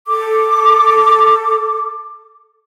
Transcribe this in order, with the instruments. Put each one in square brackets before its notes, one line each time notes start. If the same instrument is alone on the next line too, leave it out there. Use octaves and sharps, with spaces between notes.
[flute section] A4 D6